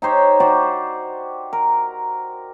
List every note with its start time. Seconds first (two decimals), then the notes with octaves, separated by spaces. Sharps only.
0.02 D#4 G4 C5 C#5
0.40 F#4 G4 C5 D5
1.53 A#4